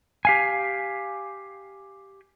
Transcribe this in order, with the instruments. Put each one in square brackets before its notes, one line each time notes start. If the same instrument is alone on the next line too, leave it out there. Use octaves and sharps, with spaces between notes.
[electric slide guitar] G4 F5 G#5